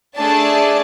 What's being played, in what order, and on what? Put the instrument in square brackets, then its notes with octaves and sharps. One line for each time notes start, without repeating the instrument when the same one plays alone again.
[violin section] A3 D4 G#4 D5 A5